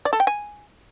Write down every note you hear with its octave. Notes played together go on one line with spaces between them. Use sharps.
D5
A4
G5
G#5